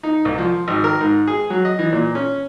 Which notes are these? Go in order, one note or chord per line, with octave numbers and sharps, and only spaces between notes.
D#4
C2
F3
G#1
A#4
G#2
G#4
F#3
D#5
E3
A#2
C#4